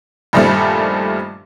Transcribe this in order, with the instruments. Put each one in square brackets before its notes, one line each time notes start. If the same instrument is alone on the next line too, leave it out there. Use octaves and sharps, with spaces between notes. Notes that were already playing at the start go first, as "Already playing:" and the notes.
[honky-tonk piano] G2 A#2 D#3 F3 G3 A3